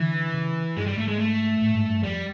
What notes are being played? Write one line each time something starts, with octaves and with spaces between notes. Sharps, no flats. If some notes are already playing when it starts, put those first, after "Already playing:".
Already playing: D3 E3
C#3
G2 G#3
G3
G#2 A3
G#3
A3
A2
G#2
G2
F2 G3